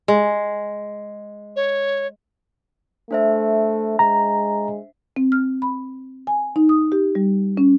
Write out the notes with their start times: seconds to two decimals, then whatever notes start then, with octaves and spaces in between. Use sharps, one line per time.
0.08 G#3
1.56 C#5
3.11 A3 D4 C5 E5
3.99 G#3 A#5
5.16 C4
5.32 F6
5.62 B5
6.27 G#5
6.56 D#4
6.69 D#6
6.92 G4
7.15 G3
7.57 C#4